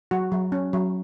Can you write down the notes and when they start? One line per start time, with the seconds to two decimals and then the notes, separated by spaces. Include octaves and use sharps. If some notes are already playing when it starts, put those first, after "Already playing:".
0.11 F#3 F#4
0.32 F#3
0.52 C#4
0.73 F#3